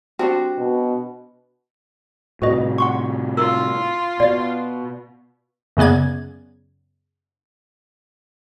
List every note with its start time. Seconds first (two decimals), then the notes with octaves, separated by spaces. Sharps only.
0.19 G3 C4 D4 D#4 F#4
0.58 B2
2.42 A2 C3 F#4 B4 D#5
2.78 F#5 C6 C#6
3.37 F4 A#4 E6
4.20 B2 D5 F5 A6
5.77 F#2 C#3 B3 D5 G#6